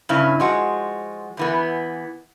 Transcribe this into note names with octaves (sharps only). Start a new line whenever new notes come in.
G2 C#3 C#4 E4
F3 G#3 F#4
E2 E3 B3